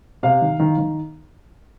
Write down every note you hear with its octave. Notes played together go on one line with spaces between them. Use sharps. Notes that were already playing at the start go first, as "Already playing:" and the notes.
C3 F5
D#3
D#3
D#3